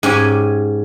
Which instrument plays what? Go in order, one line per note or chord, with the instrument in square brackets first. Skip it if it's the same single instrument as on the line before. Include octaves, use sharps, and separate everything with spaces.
[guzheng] G#2 C#4 G4 G#5